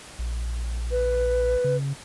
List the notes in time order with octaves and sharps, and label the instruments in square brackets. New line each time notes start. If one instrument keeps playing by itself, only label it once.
[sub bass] A#1
[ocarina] B4
[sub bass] C#3